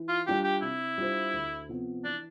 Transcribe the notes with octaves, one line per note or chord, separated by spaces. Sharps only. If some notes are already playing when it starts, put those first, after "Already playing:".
Already playing: E3
F4
G3 D4 F4 G4
G4
C3 E4
G3 D4 F4 C5
D2
C3 F3 B3
E3 D4